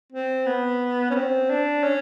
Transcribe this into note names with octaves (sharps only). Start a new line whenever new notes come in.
C4
B3
C#4
C4
D4
C#4